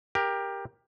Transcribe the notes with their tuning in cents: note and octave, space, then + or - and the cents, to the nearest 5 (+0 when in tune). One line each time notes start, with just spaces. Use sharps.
G4 +15 A#4 +15